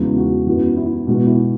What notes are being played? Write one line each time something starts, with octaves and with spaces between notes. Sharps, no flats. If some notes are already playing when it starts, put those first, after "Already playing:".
Already playing: E2 C#3 G#3 B3 F#4
F#4
F#2 E3 B3 F#4
E4
B2 G#3 B3 F#4
E4